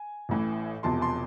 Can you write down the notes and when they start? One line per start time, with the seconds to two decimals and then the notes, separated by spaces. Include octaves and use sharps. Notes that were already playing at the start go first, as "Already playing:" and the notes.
Already playing: G#5
0.29 A1 A2 E3
0.83 E1 E2 C3 F3 A5 C6
1.01 A5 C6